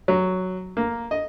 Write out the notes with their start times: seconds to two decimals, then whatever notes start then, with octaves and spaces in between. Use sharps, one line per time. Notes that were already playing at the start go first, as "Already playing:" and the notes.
0.08 F#3
0.77 A#3
1.11 D#5